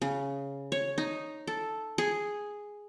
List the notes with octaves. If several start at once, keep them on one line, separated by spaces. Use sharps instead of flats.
C#3
C#5
D#4
A4
G#4